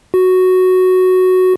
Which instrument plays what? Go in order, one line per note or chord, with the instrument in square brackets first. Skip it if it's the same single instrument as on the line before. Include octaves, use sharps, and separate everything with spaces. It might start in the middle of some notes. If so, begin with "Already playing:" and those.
[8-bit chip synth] F#4